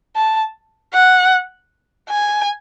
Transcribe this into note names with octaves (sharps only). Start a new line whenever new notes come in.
A5
F#5
G#5